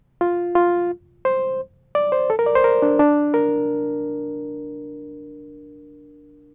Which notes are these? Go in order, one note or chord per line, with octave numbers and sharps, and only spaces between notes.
F4
F4
C5
D5
C5
A4
A#4
D5
C5
A#4
D4
D4
A#4